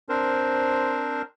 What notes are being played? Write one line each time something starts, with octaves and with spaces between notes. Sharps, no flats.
C4 D4 A#4 C5